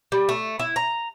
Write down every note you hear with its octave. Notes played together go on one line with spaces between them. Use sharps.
G3
A3
E4
A#5